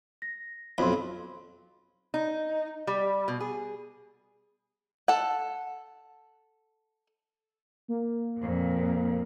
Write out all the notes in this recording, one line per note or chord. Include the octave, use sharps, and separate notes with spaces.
A#6
B1 F2 B5 C6
D#4
G3
B2
G#4
A4 F#5
A#3
F2 A#2